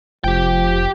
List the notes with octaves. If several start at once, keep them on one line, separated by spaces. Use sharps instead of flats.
F1 F3 G4 G5